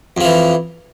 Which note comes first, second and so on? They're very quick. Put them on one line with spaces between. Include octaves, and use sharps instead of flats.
F2 F3 E3